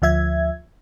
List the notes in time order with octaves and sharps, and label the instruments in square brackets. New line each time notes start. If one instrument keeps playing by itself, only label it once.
[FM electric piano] D2 F3 E5 G#6